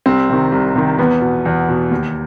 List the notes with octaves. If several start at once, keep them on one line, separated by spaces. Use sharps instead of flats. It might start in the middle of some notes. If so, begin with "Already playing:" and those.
C2 C4
C3 D#3
C2
C3 D#3
E2 B3
B2
E2
B2
D#2